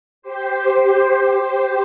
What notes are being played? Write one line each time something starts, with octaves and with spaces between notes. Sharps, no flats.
G4 C5
G4 C5